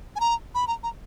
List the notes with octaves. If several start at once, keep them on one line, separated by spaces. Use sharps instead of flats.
G#5
A#5
B5
A#5
A#5